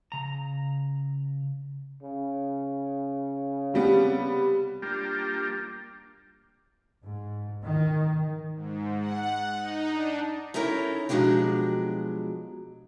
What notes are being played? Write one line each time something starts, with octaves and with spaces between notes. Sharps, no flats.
C#3 A#5
C#3
C3 G3 B3
G3 A#3 D4 F4 G4
G#2
D#3
G#2
F#5
D#4
D4
C#4 D#4 E4 A4 A#4 C#5
B2 F3 F#3 G#3 D4 G4